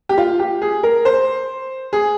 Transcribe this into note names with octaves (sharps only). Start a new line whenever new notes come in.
G4
F4
G4
G#4
A#4
C5
G#4